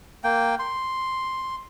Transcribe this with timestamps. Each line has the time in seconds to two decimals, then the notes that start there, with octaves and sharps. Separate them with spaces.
0.24 A#3 G5
0.59 C6